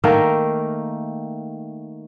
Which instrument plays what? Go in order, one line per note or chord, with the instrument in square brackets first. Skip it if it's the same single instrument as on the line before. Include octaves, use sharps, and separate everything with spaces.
[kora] D#3 A3 A#3 A#4